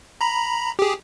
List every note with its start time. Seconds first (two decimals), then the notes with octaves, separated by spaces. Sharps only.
0.21 A#5 B5
0.79 G4 G#4